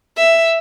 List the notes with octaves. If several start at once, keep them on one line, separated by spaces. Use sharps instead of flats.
E5